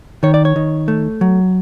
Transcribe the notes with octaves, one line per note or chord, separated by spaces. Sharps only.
D#3 C#5
D5
C#5
D#3
A3
F#3